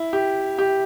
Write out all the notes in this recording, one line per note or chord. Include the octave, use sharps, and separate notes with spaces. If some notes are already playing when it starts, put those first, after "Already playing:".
Already playing: E4
G4
G4